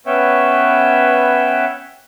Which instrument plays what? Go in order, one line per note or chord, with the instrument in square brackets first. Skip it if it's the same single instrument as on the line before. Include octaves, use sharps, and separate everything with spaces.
[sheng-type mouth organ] B3 C#4 B4 C#5 E5 G5